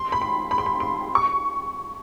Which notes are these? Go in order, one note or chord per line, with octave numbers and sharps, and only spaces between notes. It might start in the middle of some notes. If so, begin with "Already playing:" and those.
Already playing: C6
B5
C6
B5
C6
B5
C6
C#6